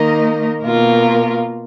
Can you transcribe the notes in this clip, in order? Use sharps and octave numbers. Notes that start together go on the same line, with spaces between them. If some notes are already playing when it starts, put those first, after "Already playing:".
Already playing: D#3 A#3 D#4 A#4 D#5
B2 A#3 F4 A#4